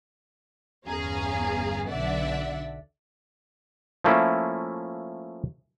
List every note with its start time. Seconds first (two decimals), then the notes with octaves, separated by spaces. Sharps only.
0.86 G1 E2 C#4 G#4 F5 A#5
1.87 B1 D3 D5 E5 F#5
4.04 F3 A3 A#3 C#4 E4